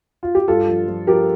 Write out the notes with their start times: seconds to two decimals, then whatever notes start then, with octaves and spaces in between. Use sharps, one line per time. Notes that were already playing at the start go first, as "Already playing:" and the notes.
0.23 F4
0.35 G4
0.48 G2 F4 A4
0.68 F3
0.87 F3
1.07 F3 G4 A#4